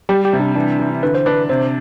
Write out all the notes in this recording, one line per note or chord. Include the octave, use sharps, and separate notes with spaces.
G3 G4
G4
C3 C4
D4
E3 D4
E3
D3 B4
C5
D4 B4
C3 C5